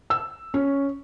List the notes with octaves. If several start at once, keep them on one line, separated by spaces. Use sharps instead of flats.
E6
C#4